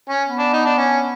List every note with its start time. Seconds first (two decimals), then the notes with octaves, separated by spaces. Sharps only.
0.10 C#4
0.27 B3
0.39 D4
0.53 D#4
0.66 D4
0.79 C#4